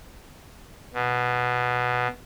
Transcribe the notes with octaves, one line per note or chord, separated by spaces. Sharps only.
B2